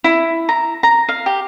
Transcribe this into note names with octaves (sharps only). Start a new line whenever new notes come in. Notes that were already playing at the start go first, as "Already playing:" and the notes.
E4
A#5
A#5
F5
G4